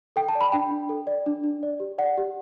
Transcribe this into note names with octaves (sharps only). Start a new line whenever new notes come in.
A4 G5
A5
D5
B5
D4 G5
D4
A4
D5
D4
D4
D5
G4
D5 F#5
G4